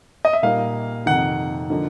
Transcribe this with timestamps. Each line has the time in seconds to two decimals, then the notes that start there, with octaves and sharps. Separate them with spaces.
0.25 D#5
0.33 E5
0.43 A#2 G3 A#3 D#4 F5
1.06 F2 C3 D#3 F#5
1.70 D3 F3 A#3 D#4